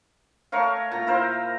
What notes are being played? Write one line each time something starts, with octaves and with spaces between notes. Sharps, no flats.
A3 A#4 C#5 F5
A#2 A#5
E4 A#4 C5 F5